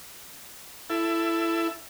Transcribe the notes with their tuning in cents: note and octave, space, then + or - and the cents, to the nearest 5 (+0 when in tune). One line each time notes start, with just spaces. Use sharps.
E4 +20 A4 +0